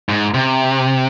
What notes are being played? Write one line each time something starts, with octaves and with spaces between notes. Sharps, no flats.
G#2
C3